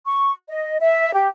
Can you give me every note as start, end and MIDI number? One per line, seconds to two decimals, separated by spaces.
0.06 0.31 85
0.48 0.77 75
0.80 1.11 76
1.14 1.28 67